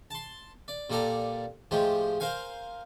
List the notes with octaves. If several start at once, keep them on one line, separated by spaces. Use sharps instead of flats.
A5 C6
D5
A#2 G3 A4 D5 A#5
A2 F3 G#3 G4
A#4 C5 F5 G#5